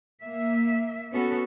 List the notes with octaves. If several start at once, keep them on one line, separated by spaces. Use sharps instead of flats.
A#3 E5
B3 C#4 F#4 A4